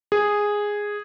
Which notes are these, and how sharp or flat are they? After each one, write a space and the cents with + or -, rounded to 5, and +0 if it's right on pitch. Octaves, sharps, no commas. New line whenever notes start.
G#4 -5